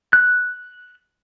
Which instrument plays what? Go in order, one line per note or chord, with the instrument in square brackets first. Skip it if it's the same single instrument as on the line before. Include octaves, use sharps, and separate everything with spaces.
[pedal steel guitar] F#6